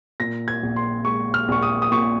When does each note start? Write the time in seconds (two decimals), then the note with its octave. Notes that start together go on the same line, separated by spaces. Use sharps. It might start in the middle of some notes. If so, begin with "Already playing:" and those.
0.20 A#2 A#6
0.48 G#6
0.63 A#1
0.76 C6
1.05 G#3 C#6
1.34 F6
1.48 A#1 C#6
1.62 D#6
1.82 D#6
1.91 A#2 C#6